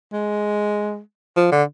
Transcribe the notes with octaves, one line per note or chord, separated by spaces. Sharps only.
G#3
F3
D3